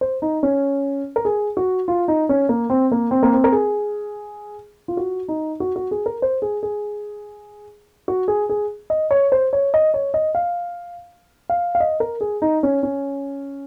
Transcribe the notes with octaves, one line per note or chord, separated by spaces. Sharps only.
C5
D#4
C#4
A#4
G#4
F#4
F4
D#4
C#4
A#3
C4
A#3
C4
A#3
C4
A#4
G#4
F4
F#4
D#4
F#4
F#4
G#4
A#4
C5
G#4
G#4
F#4
G#4
G#4
D#5
C#5
C5
C#5
D#5
C#5
D#5
F5
F5
F5
D#5
A#4
G#4
D#4
C#4
C#4